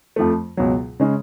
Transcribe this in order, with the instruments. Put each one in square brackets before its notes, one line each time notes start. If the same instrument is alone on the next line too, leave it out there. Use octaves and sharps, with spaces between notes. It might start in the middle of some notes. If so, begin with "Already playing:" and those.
[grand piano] F2 F3 A3
C#2 B2 F#3
C#3 G#3 C#4